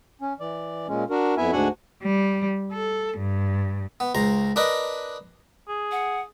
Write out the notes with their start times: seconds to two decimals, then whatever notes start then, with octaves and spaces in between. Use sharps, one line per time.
0.22 C#4
0.40 E3 D5
0.88 A#2 G#3 C#4
1.10 D4 F#4 A#4
1.37 F2 B3 E4 E5 G#5
1.52 D2 G#2 D4 F#4 F#5 G#5
2.03 G3
2.72 A4
3.18 G2
4.00 B3
4.15 C#2 C5 A#5
4.56 D4 A#4 B4 D#5
5.68 G#4
5.92 F#5